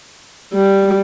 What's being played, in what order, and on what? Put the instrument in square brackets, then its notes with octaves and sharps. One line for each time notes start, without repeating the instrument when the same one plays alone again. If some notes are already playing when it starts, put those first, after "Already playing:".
[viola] G3